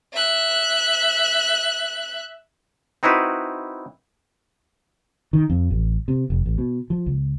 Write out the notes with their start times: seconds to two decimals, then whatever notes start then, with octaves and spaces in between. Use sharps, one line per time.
0.14 E5 F#6
3.03 C4 D#4 E4 F#4 B4
5.33 D#3
5.50 F2
5.71 A1
6.08 C3
6.30 F1
6.46 A1
6.58 B2
6.90 F3
7.06 C#2